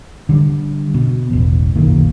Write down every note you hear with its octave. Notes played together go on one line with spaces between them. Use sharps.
D3 G3
B2
E1 A1
F#1 B1 A#2 D#3